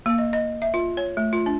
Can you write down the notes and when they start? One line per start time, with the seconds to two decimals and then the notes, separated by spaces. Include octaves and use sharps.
0.06 A#3
0.18 D#5
0.33 D#5
0.62 E5
0.74 F4
0.97 C#5
1.17 A3
1.33 F4
1.46 D4